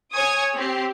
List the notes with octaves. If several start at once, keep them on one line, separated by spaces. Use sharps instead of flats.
C#5 G#5 C#6 D#6 G#6
C4 G4